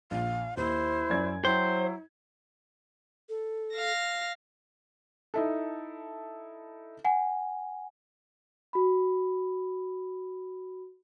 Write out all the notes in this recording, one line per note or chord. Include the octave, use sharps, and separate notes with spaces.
A#1 F5
D#2 E4 C5
F#2 D5 G#6
F#3 E4 C5 G5
A4
F5 A#6
D#4 E4 A4
F#5 G#5
F#4 B5